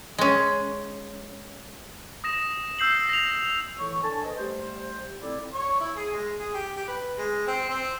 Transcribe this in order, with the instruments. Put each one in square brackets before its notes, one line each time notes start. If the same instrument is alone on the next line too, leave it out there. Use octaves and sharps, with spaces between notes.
[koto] G#3 C#4
[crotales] D#6 A#6 E7
E6 G6 C7 F#7
A#6 F7
[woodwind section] A2 E3 C#5 C#6
D3 A4 G#5 A5
B4 C5 D#5
G3 A3 C5
A2 C4 E4 D5
[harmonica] C#5
E4
G#4
G#3
G#4
G4
G4
B4
G#3
C4
C4